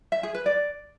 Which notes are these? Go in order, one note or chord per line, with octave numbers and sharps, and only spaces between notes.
E5
G#4
B4
D5